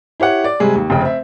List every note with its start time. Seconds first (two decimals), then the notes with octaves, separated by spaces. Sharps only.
0.20 E4 G4 C#5 F#5
0.44 D5
0.60 C3 G3 G#3 G#4
0.75 D#2
0.90 F1 C#3 G5
1.01 C4 E5